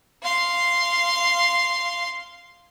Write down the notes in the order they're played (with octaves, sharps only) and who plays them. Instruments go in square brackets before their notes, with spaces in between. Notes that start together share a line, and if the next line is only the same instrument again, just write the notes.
[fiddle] F5 C6